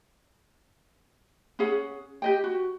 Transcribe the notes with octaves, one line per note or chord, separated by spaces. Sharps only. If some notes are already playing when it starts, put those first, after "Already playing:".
C#4 G#4 F#5
G4 D#5 G5
F#4